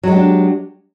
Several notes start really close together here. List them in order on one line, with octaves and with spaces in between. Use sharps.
F#3 G#3 G4 D4